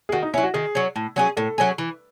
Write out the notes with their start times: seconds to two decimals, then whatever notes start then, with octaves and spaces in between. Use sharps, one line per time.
0.09 G#4
0.12 D#3 F#4
0.23 D#4
0.33 F#3 C#4 E4
0.43 F#4
0.54 D#3 G#4
0.75 F#3 C#4
0.96 A2
1.16 F#3 C#4 G#4
1.37 A2 A4
1.58 F#3 C#4 G#4
1.78 E3